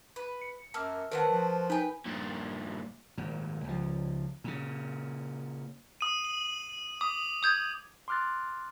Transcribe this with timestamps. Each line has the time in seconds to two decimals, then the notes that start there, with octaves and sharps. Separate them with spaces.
0.16 B4
0.41 C#7
0.74 F#2 A#3 A5 E6 F6
1.11 D#3 A3 C4 A#4 B4 F#5
1.28 F3
1.70 D#4 B4 G5 G#5
2.06 G2 A#2
3.18 G#1 A#2
3.64 C#2 F3
4.44 A#2 C#3
6.01 D#6 D#7
6.24 F#7
7.01 D6 D#6
7.43 D#6 G6 G#6
8.08 C6 D6 F6 F#6 A6